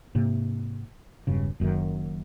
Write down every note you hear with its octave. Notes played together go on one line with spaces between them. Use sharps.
G#2 C3 A#3
E1 G2 C#3
F#1 F#2 A2 D#3